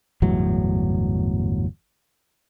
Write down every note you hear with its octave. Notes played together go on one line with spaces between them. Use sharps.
G1 E2 A2 F#3